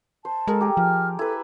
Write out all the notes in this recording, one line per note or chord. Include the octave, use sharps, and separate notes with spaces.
C5 A5
G#3 A4 A#4
G4 G#4 A#4
F3 F6
E4 A4 B4